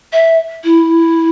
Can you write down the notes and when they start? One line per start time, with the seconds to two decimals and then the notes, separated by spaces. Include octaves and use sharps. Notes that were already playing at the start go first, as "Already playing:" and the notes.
0.13 E5
0.64 E4